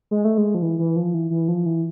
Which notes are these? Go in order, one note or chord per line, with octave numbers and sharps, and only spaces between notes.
G#3
A3
G#3
F3
E3
E3
F3
E3
E3
F3
E3